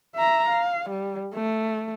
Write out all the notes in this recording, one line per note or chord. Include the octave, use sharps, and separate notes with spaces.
E5 A#5
F5
G3
A3